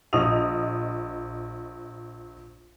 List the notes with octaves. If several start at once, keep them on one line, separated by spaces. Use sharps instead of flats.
A#1 D#5 D#6 F7